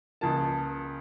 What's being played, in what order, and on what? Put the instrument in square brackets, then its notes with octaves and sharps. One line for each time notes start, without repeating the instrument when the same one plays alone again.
[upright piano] C#2 C#3 F3 A#3 A5